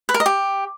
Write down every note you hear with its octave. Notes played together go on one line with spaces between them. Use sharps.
B4
A#4
D#5
G4